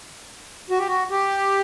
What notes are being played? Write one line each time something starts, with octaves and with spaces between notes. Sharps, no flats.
F#4
G4
F#4
G4